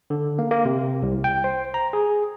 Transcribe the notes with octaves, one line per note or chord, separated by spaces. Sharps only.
D3
A#3
A#3
C3
C2
G5
C5
A#5
G#4